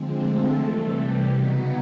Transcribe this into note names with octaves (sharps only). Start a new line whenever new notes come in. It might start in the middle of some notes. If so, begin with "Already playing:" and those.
Already playing: D3 F3 G#3 C4
A3 A4
C3 E3 G3 A3 A4
G3 G4
C#3 F#3 B3 D#4 F#4